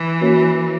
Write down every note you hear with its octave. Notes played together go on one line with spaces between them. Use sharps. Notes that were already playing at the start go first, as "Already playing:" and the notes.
Already playing: E3
A#3 C#4 F#4 A#4 C#5